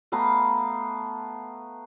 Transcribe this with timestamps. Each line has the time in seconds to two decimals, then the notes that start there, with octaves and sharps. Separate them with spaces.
0.12 A3 B3 F5 A#5